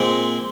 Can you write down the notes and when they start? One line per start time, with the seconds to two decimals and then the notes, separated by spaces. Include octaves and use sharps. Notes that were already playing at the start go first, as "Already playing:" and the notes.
Already playing: A#2 G#3 C4